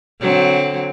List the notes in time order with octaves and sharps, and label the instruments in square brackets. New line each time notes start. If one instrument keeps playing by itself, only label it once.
[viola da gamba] D3 F#3 C4